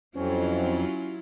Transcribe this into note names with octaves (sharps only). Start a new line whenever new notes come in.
F2 F#3 C4 C#4 E4 F4